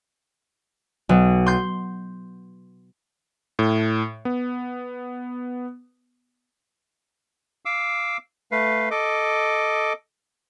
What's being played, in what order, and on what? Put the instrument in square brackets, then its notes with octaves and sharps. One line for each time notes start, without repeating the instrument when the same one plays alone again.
[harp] B1
C6 G6
[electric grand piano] A2
B3
[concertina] F5 D6 E6
A3 B4 F5
A4 D#5 D6